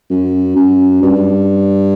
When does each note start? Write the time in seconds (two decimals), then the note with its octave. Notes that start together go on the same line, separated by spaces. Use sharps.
0.10 F#2
0.56 F#2
1.02 G2